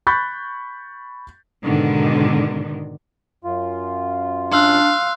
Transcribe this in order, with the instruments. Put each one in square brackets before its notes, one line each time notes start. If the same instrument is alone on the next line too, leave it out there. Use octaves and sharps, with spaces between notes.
[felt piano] B5 C#6 F#6 G6 A6 B6
[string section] G#2 B2 D3 D#3
[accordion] F#2 F4
[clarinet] D4 [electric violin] F5 [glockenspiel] C6 E6 F#6